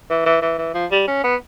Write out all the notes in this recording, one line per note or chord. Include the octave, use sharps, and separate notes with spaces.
E3
E3
E3
E3
F3
G3
C#4
B3